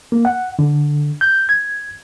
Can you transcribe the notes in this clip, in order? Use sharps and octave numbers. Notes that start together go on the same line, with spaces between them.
A#3
F#5
D3
G6
G#6